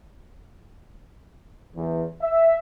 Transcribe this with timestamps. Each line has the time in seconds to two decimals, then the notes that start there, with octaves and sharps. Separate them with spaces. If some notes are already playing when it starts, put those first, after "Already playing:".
1.76 E2
2.22 E5